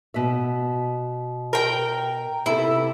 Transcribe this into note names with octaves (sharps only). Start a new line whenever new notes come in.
B2 E5
A#4 G5
C3 B3 E4 A4